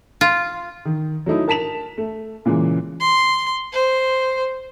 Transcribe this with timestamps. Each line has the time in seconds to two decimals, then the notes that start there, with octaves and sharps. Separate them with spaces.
0.21 F4
0.85 D#3
1.26 F#3 A3 D#4 E4
1.48 A#4 A5 B6 E7 F7
1.98 A3
2.45 A#2 C#3 E3 G#3 A#3
3.00 C6
3.72 C5